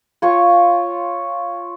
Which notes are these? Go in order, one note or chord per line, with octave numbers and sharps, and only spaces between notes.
F4 C#5 C#6